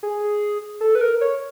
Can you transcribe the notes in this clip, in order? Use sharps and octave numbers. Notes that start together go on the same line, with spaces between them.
G#4
A4
B4
A#4
C#5